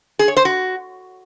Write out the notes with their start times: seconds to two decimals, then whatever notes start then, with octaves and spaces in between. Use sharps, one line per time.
0.19 G#4
0.28 C#5
0.37 C5
0.45 F#4